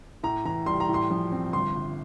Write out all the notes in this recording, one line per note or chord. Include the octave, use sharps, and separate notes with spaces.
A2 A#5
E3 A#5
G3 C6
A#5
A2
C6
F3
C4
G1 C6
G1